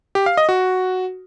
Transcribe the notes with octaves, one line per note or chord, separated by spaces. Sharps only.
G4
F5
D#5
F#4